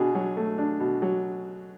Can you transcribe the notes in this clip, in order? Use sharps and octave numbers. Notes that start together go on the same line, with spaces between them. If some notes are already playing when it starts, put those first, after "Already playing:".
Already playing: B2 D4 G#4
F#3
A3
D4
B2
F#3